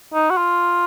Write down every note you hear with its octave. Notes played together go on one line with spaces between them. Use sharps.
D#4
F#4
F4